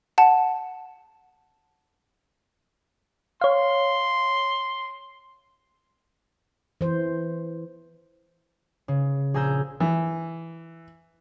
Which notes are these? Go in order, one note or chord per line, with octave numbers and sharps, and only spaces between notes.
F#5 A5
C#5 F5 C6
E3 C5
C#3
A#1 G#4 G#5 A#5 E6 G6
E3